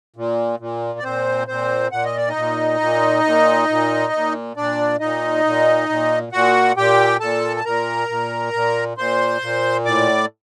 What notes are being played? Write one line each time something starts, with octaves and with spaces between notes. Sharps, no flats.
A#2
A#2
D5
A#2 C4 C5
A#2 C4 C5
A#2 F#5
D#5
D5
D#4 D#5
A#2
A#2
A#2
A#2
A#2
A#2 D4 D5
A#2 D#4 D#5
A#2
A#2
A#2 F#4 F#5
A#2 G4 G5
A#2 A4 A5
A5
A#2 A#4 A#5
A#2
A#2
A#2 C5 C6
A#2
A2 D5 D6